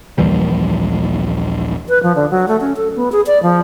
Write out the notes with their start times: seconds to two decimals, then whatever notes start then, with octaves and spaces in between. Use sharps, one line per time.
0.18 A#1 D#2 E3 G3
1.89 B4
2.03 F3
2.16 D3
2.31 F#3
2.48 A3
2.61 C#4
2.76 A4
2.96 B3
3.12 G#4
3.27 D5
3.43 F3